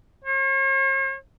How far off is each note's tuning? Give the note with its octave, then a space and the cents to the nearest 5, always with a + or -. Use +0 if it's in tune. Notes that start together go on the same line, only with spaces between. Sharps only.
C#5 -45